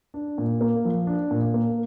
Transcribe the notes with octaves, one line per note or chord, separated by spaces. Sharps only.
D4
A#2
A#3
F3
D4
A#2
A#3